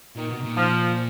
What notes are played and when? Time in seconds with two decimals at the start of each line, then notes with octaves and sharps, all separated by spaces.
0.16 A#2 D#3
0.29 B2
0.44 A#2
0.57 F3